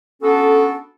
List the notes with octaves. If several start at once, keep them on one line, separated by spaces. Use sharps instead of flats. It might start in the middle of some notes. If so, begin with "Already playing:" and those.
B3 C#4 D4 F#4 A4